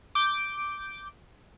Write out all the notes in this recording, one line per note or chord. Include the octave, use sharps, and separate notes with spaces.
D6 G6